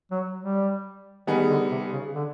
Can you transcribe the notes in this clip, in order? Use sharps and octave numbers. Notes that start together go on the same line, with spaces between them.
F#3
G3
D#3 G3 B3 D#4 G#4
D3
C3
C#3
D3